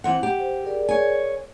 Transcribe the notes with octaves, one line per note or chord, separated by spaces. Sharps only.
E3 C4 F#5
G4
C5
G#4 A#4 D5
C#5 G#5